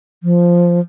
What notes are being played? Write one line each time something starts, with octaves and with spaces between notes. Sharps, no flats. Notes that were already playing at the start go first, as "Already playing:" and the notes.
F3